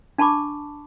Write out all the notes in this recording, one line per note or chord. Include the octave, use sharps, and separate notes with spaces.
D4 A5 B5 C#6 D6